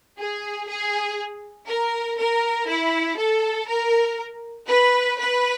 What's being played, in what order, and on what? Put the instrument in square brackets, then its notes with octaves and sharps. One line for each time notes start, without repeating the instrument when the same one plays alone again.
[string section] G#4
G#4
A#4
A#4
E4
A4
A#4
B4
B4